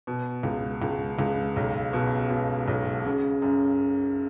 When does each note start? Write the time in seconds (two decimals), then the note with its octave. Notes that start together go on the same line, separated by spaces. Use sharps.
0.07 B2
0.43 C#2
0.82 C#2
1.19 C#2
1.56 B1
1.93 B2
2.30 B2
2.68 B1
3.05 C#3
3.42 F#2